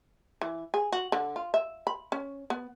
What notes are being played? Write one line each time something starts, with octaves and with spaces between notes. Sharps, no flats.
E3
G#4
F#4
D3
F4
E5
B5
C#4
B3